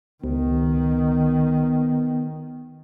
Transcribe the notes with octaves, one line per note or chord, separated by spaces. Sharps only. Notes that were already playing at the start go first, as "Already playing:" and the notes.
C#2 D#3 B3